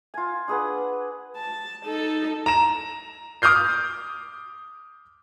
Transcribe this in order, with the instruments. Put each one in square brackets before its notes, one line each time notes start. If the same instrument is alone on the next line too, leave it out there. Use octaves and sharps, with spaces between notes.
[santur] F4 G#5
D4 G#4 B4 F#5
[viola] A5
D#4 A4
[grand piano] A#5 E7
D6 D#6 F6 G6 C7